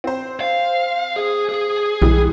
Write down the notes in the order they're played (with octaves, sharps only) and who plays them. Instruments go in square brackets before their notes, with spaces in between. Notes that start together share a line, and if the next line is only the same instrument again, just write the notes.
[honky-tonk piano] C4 C5
[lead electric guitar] F5
G#4
G#4
[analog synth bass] B1 [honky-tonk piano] E3 G3 G#3